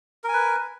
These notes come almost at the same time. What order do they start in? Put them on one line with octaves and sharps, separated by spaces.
A#4 G#5 B4